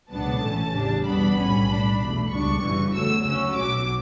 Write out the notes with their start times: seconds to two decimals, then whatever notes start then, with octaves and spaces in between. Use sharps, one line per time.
0.11 C#2 B2 F#3 B3 D4 A5
0.43 A1 A2 E3 A3 C#4
0.74 E2 C#3 G3 D4
1.06 E2 B2 G3 B3 D4 B5
1.38 B1 A2 G3 C#4
1.68 A2 G3 D4
2.00 E2 B2 A3
2.31 C#2 B2 G3 D4 C#6
2.63 G1 F#2 C#3 E3 G3
2.94 E2 D3 F#3 A3 E6
3.25 D2 C#3 F#3 C#4 E6
3.57 B1 B2 F#3 D6